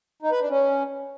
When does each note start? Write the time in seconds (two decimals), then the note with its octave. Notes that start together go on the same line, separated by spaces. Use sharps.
0.23 D#4
0.32 B4
0.41 D4
0.50 C#4